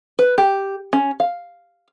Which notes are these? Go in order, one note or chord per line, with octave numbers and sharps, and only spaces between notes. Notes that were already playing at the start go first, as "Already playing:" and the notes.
B4
G4
C#4
F5